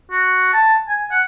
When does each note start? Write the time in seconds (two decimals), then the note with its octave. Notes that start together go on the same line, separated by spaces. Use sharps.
0.11 F#4
0.53 A5
0.89 G#5
1.11 F#5